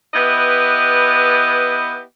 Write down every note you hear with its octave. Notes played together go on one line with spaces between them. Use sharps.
B3 E4 G4 B4 D#5